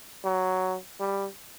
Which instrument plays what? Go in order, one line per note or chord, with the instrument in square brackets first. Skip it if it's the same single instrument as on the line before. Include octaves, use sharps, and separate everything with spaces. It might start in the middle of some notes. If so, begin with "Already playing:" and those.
[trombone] F#3
G3